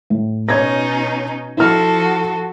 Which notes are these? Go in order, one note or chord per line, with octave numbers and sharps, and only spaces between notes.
A2
B2 C#4 D#4 C#5 G#6 A#6
F3 E4 F#4 A4 F6